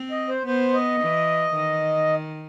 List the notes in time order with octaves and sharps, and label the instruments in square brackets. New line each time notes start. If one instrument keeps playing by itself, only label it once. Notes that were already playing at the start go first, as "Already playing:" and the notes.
Already playing: [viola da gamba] C4
[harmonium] D#5
C5
[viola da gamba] B3 [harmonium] C5
[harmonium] D#5
[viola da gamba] E3
D#3